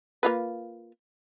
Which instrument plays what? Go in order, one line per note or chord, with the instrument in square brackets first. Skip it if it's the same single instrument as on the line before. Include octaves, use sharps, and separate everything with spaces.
[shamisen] A#3 F4 B4